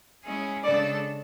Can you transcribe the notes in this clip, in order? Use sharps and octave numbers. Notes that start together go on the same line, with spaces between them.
G#3 C#4 E4 G#4
C#3 G#3 D4 A4 D5